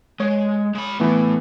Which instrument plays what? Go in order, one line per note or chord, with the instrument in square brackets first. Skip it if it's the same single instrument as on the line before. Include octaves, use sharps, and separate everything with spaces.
[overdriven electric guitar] G#3 [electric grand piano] C#5
[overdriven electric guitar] G#3 B5
[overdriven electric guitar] A2 A3 [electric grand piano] E3 B3